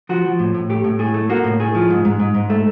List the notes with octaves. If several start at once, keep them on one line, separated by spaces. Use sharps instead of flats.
F3 F#4
F3
A2
A2
A3 G4
A2
A2 G#4
A3
A#3 F#4
A2
A2 G#4
F3
G#2
G#2
G#2
G#2
A3